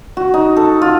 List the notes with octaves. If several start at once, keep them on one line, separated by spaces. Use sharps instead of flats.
F#4
D#4
A4
F4